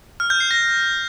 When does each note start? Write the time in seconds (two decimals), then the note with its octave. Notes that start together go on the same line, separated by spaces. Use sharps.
0.20 F6
0.30 G6
0.40 C7
0.51 A#6